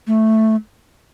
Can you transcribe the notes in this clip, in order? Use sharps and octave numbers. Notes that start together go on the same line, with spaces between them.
A3